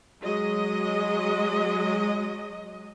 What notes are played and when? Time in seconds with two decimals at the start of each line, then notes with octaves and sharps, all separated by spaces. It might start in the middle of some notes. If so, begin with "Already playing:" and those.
0.22 F#3 G#3 D#5